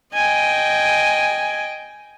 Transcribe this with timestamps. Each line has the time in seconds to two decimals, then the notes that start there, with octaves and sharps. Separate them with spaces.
0.14 D#5 G5 G#5